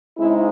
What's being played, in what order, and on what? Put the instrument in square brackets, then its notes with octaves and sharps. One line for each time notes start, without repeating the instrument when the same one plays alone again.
[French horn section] C#3 G#3 C4 D#4 E4